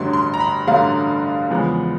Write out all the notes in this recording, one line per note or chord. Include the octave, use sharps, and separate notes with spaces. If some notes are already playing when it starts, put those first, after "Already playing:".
Already playing: A1 G2 D3 F#3 A3 C6
C6
A#5
B5
A1 G2 D3 F#3 A3 F5
E2 C#3 F3 G#3 B3